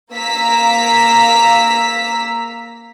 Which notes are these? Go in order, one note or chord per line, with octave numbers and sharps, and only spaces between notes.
A#3 A#5 E6 B6